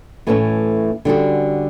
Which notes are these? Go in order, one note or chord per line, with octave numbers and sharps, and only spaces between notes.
A2 E3 A3 C#4
D3 G3 C#4 F#4